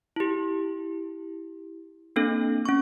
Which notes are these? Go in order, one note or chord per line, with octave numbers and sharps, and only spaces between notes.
E4 G4
A#3 C4 D4 A4
C#4 C#6